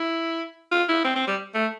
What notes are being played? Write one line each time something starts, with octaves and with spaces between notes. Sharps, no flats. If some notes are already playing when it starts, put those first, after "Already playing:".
Already playing: E4
F4
E4
C4
C4
G3
A3